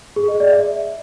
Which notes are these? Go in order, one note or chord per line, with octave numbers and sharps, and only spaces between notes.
G#4
D#5
D5
E5